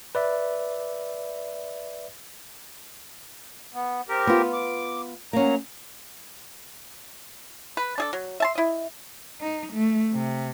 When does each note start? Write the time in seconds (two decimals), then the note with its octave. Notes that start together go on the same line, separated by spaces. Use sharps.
0.15 B4 D5 E5
3.74 B3
4.09 C4 G4 A#4
4.27 B3 F4
4.53 D6
5.33 F#3 A#3 C#4 A#5
7.77 B4
7.98 D4 G#4 A4
8.13 F#3
8.40 E5 A5 C6
8.55 E4 D#5
9.41 D#4
9.73 A3
10.12 C3